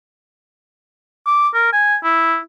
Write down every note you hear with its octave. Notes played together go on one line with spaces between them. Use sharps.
D6
A#4
G#5
E4